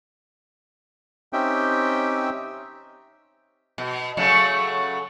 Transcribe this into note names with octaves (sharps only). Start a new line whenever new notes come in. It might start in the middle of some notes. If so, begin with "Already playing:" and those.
C4 C#4 D#4 G4 E5 G5
B2
C#3 F#3 A3